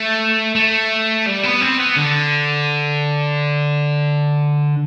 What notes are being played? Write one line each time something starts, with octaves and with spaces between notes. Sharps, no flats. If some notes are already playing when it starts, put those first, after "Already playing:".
Already playing: A3
A3
G3
B3
C4
B3
D3